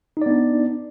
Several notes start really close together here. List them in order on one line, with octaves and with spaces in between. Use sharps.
D#4 D5 B3 D4